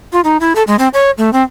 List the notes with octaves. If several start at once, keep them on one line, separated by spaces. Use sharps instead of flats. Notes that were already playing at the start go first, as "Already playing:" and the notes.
F4
D#4
E4
A4
G#3
C4
C#5
A3
C4